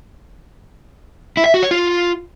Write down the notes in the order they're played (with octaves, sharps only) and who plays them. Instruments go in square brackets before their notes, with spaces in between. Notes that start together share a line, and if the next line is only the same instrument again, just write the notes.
[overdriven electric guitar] E4
E5
F#4
C#5
F4